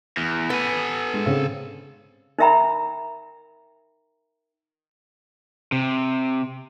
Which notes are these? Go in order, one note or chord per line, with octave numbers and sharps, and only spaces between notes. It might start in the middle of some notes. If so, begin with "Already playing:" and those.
E2
B3 A4 G#5
G#3
C#3 C4 G#4
D#4 A#4 E5 G5 A#5 B5
C3